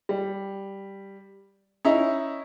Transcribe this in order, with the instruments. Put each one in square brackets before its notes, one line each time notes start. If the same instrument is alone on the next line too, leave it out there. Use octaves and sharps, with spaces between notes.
[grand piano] G3
C#4 D#4 E4